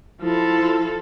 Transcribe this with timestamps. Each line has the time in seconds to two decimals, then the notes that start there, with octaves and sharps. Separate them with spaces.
0.22 F3 E4 A4